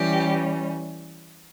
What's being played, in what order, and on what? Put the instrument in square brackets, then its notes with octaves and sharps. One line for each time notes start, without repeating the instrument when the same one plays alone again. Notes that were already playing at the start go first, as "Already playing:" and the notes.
Already playing: [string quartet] E3 G3 C#4 G4